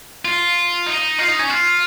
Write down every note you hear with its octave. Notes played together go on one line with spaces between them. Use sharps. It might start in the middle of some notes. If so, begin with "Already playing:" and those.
F4
D#4
F4
D#4
C#4
F4